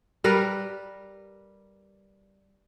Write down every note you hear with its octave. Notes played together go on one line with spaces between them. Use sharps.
G3 A#4 B4